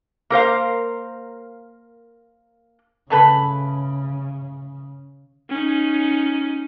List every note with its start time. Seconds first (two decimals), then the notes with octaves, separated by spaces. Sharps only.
0.30 A#3 A#4 C5 F5
3.10 C#3 E3 A3 B4
5.50 C#4 D#4